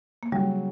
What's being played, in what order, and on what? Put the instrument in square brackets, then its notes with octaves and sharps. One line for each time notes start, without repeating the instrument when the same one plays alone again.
[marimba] A#3
[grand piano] C#3 F#3 C#4 G4 [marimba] G3